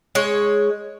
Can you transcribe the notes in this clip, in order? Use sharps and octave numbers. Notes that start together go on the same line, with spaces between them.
G#3 C#5